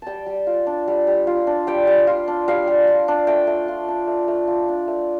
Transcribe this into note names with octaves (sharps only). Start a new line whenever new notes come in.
G3 G5 A5
G3
F4
D4
G3
G3
F4
D4
G3 G5
G3
F4
D4
G3 F5
G3
F4
D4
A3 G5
A3
F4
D4
A3
A3
F4
D4
A3